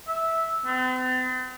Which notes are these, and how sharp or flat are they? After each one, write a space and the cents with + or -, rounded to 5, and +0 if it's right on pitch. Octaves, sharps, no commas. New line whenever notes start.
E5 -10
C4 -45